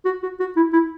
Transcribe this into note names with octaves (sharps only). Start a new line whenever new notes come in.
F#4
F#4
F#4
E4
E4